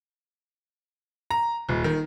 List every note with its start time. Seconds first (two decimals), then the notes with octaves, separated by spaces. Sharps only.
1.31 A#5
1.69 D#1
1.84 D#3